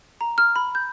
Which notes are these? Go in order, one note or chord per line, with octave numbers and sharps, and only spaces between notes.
A#5
F6
B5
G6